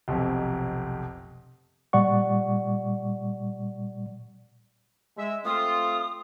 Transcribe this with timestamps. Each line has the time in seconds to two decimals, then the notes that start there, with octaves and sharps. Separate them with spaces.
0.08 F1 B1 F2
1.93 A#2 G3 D5 F#5 C#6
5.17 G#3 E5
5.45 A3 C4 F4 D#6